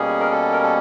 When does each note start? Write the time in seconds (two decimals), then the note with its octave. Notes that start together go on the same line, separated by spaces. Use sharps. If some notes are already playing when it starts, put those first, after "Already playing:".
Already playing: B2 G3 A#3 C#4 G#4
0.20 A#4
0.31 A4
0.52 A#4
0.63 A4